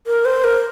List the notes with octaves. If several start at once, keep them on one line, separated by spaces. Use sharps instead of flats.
A#4
C5
A#4